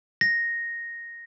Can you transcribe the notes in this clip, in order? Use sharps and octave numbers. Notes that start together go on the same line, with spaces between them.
A#6